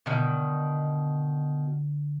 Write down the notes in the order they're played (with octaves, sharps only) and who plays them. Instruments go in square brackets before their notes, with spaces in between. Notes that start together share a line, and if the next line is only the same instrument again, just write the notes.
[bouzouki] B2 D#3 [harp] D3 B3